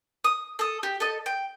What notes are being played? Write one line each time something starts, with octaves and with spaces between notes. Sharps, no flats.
D#6
A4 D#6
G4
A4 D#5
G5